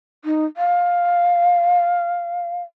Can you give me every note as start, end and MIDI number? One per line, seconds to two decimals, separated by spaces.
0.25 0.45 63
0.57 2.63 77